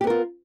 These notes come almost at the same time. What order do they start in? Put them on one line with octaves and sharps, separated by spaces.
G4 B3 A#4 F4